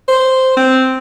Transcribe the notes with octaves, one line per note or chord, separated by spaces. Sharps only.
C5
C4